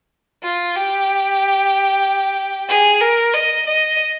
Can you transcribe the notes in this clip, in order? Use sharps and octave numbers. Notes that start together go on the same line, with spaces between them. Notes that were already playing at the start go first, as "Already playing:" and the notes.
F4
G4
G#4
A#4
D#5
D#5